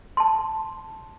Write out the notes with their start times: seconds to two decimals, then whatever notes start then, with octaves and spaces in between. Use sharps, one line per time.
0.17 A5 C6